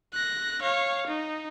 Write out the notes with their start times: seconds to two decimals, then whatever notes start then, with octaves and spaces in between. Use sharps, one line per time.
0.13 F#6 A#6
0.62 C#5 F5
1.07 D#4